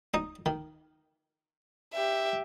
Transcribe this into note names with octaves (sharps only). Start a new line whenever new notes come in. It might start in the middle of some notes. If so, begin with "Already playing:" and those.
D#4 D#5
D#3
G4 E5